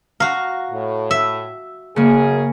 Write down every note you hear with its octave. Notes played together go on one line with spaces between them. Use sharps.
F#4 F5 A#5
A2
E5
F#2 C#3 A#3 G#4